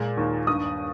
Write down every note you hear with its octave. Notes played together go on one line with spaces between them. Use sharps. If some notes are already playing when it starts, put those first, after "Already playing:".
Already playing: A#2 G#3
D#2
G2 D#6